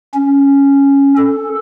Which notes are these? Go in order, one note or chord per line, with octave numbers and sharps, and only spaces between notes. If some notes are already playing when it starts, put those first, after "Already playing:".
C#4
A4